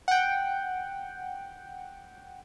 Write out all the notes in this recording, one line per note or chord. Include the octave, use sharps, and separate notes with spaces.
F#5 G5